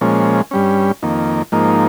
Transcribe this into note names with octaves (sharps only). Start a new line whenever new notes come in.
A#2 F3 G#3 C#4
G2 G3 C#4
F2 D#3 A#3
G#2 F3 A#3 D#4